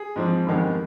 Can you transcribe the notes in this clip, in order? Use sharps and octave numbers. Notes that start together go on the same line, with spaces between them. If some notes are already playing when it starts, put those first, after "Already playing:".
Already playing: G#4
G#2 F3 C4
G1 F2 D#3 G#3 B3